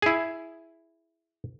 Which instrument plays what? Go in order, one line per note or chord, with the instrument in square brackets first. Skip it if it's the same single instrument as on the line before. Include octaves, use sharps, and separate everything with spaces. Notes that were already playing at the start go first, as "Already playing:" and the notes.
[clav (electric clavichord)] E4 G#4